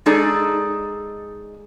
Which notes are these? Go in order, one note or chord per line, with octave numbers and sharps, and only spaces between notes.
G#3 D#4 G#4 A4 D5